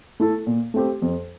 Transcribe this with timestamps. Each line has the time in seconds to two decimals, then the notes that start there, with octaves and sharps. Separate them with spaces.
0.20 A3 E4 A4
0.47 A#2
0.74 A3 C4 G4
1.02 F2